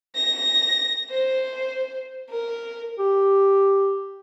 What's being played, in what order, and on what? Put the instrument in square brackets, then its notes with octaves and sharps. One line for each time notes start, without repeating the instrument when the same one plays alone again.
[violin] A#6
C5
A#4
[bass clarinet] G4